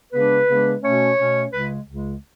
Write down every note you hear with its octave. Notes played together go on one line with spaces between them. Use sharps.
C#3 G#3 B3 D4 B4
C#3 G#3 B3 D4
B2 A3 C#4 C#5
B2 A3 C#4
C#2 C#3 G#3 B4
C#2 C#3 G#3